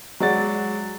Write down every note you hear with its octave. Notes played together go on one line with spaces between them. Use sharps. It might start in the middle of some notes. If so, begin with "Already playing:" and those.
F#3 G#3 D5 F#5 A6